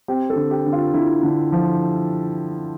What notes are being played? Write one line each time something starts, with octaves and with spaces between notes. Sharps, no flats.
C4 G4
A4
D3
G4
D3
F4
D3 E4
D3
F3